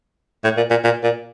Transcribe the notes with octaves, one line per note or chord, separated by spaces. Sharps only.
A2
A#2
A#2
A#2
A#2